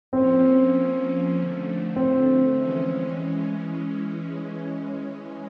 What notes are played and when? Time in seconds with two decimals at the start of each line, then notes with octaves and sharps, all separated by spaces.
0.12 F3 A#3 C4 C#4
1.35 D3 F3 A3
1.96 C4
2.56 E3 G#3 C#4